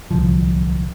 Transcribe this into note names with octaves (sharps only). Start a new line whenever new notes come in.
D1 C2 F3